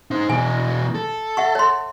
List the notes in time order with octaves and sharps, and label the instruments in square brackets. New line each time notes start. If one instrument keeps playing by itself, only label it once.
[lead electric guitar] D#4 C5
[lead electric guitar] B2 E3 [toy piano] G#5
[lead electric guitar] A4
[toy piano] E5 F#5 C#6
C#5 C6